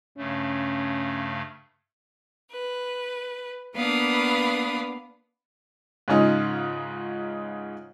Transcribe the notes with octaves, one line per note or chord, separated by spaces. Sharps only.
G2 C#3 A3 C#4
B4
A#3 B3 D4 B4 F5 D#6
G#2 C#3 C#4 D#4 F4